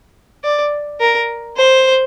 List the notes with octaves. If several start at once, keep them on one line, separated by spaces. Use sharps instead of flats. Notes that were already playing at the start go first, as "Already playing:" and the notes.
D5
A#4
C5